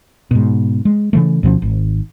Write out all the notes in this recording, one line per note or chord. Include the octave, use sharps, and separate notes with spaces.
G#2 B2
G#3
C#3 E3 A3
D2 B2 F3 C#4
G#1